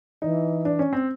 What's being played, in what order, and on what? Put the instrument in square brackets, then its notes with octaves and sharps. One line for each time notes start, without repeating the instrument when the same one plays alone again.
[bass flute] E3 [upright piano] D#4
[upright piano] D4
C#4
C4